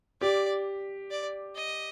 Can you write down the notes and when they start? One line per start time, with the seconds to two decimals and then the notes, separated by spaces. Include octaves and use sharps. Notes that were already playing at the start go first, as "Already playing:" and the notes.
0.21 G4 D5
1.11 D5
1.55 D#5